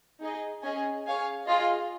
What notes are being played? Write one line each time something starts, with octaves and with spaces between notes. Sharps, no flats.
D#4 G#4 D#5
C#4 G#4 D#5 G#5
G#4 C#5 F5 G#5
F4 G#4 D#5